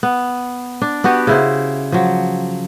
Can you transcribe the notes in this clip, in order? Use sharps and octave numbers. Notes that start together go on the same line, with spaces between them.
B3
D4
B3 F#4 G4 B4
C#3 E4 C5
F3 F#3